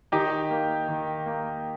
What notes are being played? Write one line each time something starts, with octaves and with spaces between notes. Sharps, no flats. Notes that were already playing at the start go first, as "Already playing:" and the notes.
D#3 D#4 G4
A#3
D#3
A#3